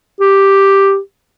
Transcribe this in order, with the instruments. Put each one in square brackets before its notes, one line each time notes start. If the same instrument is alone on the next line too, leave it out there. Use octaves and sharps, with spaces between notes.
[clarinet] G4